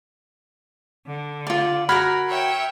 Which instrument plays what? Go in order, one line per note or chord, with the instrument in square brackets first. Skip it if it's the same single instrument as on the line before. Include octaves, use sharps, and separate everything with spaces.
[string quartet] D3
[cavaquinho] F4 D5
[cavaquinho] F#4 G#4 A#4 [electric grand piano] B5 F6 G#6
[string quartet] C#5 E5 G5